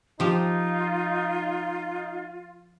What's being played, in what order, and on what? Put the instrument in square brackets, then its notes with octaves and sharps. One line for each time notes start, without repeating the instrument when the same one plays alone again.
[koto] F3 G4 [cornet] D#4 [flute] F4